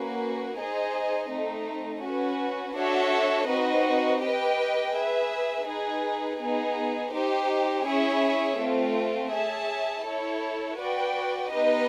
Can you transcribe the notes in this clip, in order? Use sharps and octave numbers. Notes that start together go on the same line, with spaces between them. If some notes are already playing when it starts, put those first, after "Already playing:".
Already playing: A#3 C#4 F#4 B4
D#4 G#4 C5 D#5
A3 C4 D#4
C#4 F#4 B4
D4 F#4 A4 C#5 E5
C4 D#4 F#4 B4 D#5
G4 B4 D#5 G5
G#4 B4 E5
D#4 G#4 B4
B3 D#4 G#4
D#4 G4 C5
C#4 E4 G#4 C#5 E5
A3 C4 F4
G#4 C#5 E5 A5
E4 A4 C#5
F#4 B4 D5 G5
B3 D#4 G4 B4 D#5